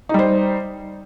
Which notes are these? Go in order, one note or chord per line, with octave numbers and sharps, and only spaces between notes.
G3 D#4 C5